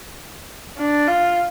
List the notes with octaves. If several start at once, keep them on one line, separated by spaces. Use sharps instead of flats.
D4
F4